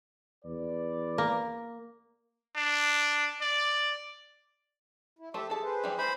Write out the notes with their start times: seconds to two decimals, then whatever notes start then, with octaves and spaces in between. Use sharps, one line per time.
0.45 E2 B4 D5
1.18 A#3
2.56 D4
3.41 D5
5.19 E4
5.34 A3 G4 C5 E5 A5
5.50 G#4 A4 A5
5.63 G#4 B4 C5
5.84 E3 G3
5.99 E3 G#3 A#4 C5 B5